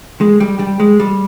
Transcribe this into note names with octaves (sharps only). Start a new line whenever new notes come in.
G#3
G3
G3
G#3
G3